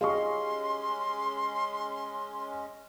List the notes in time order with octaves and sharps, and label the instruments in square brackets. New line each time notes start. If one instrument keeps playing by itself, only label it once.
[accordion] G#3 C#4 [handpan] G4 D#5 F5 [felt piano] G#4 C#6 [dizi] C6